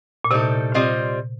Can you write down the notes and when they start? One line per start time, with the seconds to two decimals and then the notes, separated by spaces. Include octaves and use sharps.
0.25 A#2
0.31 A2 C3 G3 A#3 D#4 A4
0.74 G3 C4 F4 C5 D#5